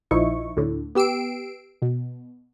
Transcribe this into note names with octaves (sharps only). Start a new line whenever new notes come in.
A#1 F3 D#4 E4 C#6
D2 A2 D3
B3 G4 E6 C7 D7
B2